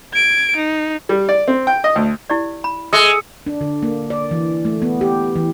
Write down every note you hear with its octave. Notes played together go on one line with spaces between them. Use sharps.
G#6 D7
D#4
G3
D5
C4
G5
D#5
D2
E4 G4 D5
B5
G#3 A4 E5 C6 D#6 E6 C#7
D4
D3
A#3
D5
E3
A3
B3
G4
E3